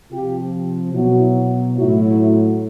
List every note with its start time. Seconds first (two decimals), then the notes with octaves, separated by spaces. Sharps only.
0.11 C3 F3 F4 G4
0.93 B2 F#3 E4 F#4
1.76 A2 F#3 E4 F#4